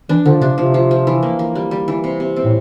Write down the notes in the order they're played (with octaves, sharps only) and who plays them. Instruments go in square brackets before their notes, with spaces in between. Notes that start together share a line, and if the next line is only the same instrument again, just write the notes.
[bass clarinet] E3 [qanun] D4
[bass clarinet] D3 [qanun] F3
[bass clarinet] C3 [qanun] D4
[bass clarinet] C3 [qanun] F3
[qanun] F3
F3
E3
A#3
A#3
G3
G3
E3
C3
C3
C4
[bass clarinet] A2